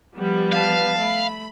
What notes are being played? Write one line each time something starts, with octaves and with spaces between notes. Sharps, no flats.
F3 G3 B3
B4 F5 A5
A3 B5